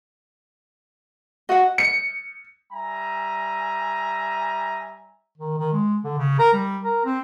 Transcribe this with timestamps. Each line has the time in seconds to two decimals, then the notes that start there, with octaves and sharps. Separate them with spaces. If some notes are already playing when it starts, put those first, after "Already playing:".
1.49 F#4 D#5 F#5
1.78 C#7
2.73 G3 E5 G#5 A#5
5.38 D#3
5.59 D#3
5.73 G#3
6.04 D3
6.18 C#3
6.39 A#4
6.53 G3
6.84 A#4
7.05 C4